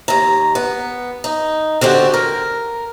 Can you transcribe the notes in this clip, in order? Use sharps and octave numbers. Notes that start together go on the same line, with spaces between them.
D#2 A#5
B3
D#4
D3 C4 F#4 G4
A#4